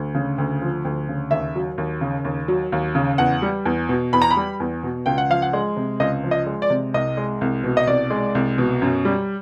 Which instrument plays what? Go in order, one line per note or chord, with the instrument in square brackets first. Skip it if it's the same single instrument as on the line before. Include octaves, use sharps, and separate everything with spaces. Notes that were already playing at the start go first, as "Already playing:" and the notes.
Already playing: [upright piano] D2
C#3
D2
F3
D2
C#3
D#2 E5
F#3
D#2
C#3
D#2
F#3
D#2
C#3
E2 F#5
G3
E2
B2
E2 B5
A#5
B5
G3
E2
B2
C#2 G5
F#5
F3 F5
F#5
G#3
C3
C#2 D#5
F3
D#5
G#3
D5
C3
C2 D#5
G#3
C2
B2
D#5
C2 D5
G#3
C2
B2
F#2
G3